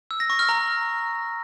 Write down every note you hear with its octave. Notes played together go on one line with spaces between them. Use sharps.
E6
A#6
C#6
F6
A#5